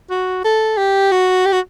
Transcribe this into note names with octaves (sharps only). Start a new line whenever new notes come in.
F#4
A4
G4
F#4
G4
F#4